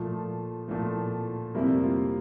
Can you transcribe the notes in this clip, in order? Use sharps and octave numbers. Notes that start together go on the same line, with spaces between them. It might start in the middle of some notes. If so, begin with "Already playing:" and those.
Already playing: A#2 F3 A3 F4
A#2 F3 A3
F2 C3 G3 A#3 E4
F4